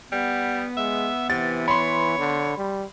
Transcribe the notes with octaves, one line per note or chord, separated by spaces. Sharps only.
G3 B3
G#3 E5
C3 E3 A6
C#5 B5 C6
D3
G3